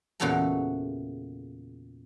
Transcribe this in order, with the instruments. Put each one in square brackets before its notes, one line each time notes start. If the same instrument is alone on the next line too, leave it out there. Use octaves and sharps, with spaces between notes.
[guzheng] E2 A#2 C#3 F#4 A4 A#5